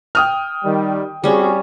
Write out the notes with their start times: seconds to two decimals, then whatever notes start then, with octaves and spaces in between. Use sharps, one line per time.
0.15 G5 D#6 F6
0.64 D#3 G3
1.24 G3 C4 C#4 F#4 G#4